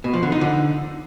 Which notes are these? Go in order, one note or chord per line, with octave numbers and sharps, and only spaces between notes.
B2
F3
D3
D#4
D3